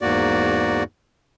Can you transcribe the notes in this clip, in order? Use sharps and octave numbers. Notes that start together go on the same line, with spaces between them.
E2 G#2 A#3 F#4 D5